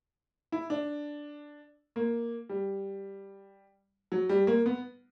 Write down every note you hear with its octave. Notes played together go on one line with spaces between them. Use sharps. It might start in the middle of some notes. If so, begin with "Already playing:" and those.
E4
D4
A#3
G3
F#3
G3
A#3
B3